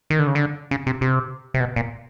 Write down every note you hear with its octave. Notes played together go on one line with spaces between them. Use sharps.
D#3
D3
C#3
D3
C#3
C3
C3
C3
B2
A#2